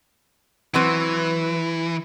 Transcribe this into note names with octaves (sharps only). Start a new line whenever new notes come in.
E3 F#3 C4 B4